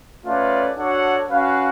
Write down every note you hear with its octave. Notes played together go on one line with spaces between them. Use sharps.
A3 C#4 F4 B4 D5
D4 F#4 A4 C#5 F#5
C#4 F#4 B4 F5